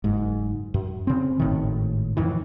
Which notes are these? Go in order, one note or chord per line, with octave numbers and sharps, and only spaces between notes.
F#1 G#2
F#2
C#3 C4
G#1 A2 D#3
F2 A2 D#3 E3